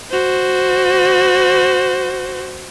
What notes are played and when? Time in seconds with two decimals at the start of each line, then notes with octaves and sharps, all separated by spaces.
0.10 F#4 C5